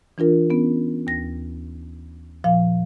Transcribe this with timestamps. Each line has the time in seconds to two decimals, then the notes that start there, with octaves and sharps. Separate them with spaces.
0.18 E3 D4 F4 A#4
0.50 B3 C#4
1.07 D#2 A#6
2.44 A#2 F3 F5